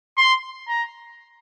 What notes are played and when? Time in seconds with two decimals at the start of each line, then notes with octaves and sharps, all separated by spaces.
0.17 C6
0.68 A#5